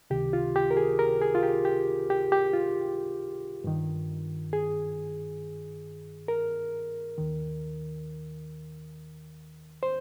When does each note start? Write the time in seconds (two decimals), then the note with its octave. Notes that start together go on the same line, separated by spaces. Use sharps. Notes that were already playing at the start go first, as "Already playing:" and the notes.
0.10 C#2 C3 D#3 G4
0.33 F4
0.56 G4
0.71 A#4
0.77 G#4
0.99 A#4
1.21 G#4
1.35 F4
1.43 G4
1.65 G4
2.10 G4
2.32 G4
2.53 F4
3.64 G2 D#3
4.53 G#4
6.28 A#4
7.18 D#2 D#3
9.83 C5